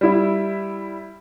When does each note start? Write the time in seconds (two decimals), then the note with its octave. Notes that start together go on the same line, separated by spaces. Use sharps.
0.01 G3 E4 E5